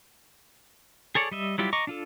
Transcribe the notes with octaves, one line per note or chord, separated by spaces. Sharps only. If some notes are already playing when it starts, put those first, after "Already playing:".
G#4 A4 C#5 D5
G3 D#5 E5
F#3 G3 E4 F4 G4
D#5 A#5 C#6 D6
D4 F4 A4